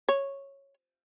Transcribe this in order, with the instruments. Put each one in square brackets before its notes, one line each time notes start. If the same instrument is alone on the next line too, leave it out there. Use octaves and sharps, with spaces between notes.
[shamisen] C#5